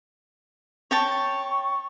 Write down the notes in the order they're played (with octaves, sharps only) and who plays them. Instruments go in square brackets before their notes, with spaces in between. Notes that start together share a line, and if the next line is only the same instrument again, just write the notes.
[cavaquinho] C#5 G5 A5 [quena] C#6